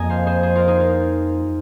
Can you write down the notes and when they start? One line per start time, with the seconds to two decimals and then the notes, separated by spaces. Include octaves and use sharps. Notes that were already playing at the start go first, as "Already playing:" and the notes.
Already playing: F2 F3 A#3 D#5 G#5 A#5
0.10 C5 F5
0.27 G#4 C5
0.43 G#4 C5
0.55 F4 A#4
0.68 D#4 G#4
0.80 F4